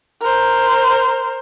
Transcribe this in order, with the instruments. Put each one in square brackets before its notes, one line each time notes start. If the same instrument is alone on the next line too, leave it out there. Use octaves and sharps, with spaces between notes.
[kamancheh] A#4 C5